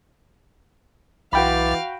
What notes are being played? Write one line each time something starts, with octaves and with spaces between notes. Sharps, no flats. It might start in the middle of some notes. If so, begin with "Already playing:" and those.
B1 E3 F#4 F5 G5 B5 D6 A6